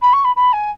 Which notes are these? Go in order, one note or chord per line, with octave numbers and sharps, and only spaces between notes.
B5
C#6
B5
B5
G#5